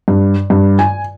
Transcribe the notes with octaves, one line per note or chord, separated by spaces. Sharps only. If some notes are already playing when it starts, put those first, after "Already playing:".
G2
G2
G#5